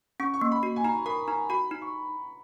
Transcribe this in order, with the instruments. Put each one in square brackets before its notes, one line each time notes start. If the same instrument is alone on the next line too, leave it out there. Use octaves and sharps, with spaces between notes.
[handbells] C#4 [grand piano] C#6
[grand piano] C#6
[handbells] A#3
[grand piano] B5
[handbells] F#4
[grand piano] G#5
[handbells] D#4 [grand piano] A#5
[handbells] A#4 [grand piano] B5
[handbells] D#4 [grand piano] A#5
[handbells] F#4 [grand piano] B5
[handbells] D#4
[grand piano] C#6